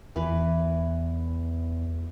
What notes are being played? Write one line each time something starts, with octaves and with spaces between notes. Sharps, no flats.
E2 E3 B4